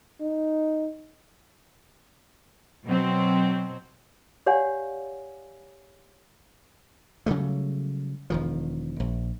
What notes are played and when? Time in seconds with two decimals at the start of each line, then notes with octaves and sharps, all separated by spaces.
0.21 D#4
2.84 B2 F#3 C4
4.46 G4 C#5 D5 F5 F#5 G#5
7.26 C#3 F#3 G3 A3
8.30 E1 D#3 F3
9.00 A#1